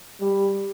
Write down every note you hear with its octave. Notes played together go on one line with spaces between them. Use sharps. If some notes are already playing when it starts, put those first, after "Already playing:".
G3